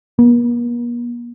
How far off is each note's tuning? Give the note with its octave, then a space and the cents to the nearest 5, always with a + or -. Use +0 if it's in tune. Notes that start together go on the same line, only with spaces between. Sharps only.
A#3 +45